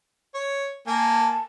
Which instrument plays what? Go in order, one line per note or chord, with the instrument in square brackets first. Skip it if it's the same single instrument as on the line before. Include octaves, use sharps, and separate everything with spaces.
[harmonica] C#5
[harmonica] A#3 G#5 [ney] A5